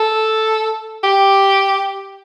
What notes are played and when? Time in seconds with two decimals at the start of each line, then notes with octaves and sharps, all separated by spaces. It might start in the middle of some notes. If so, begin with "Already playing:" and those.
Already playing: A4
1.03 G4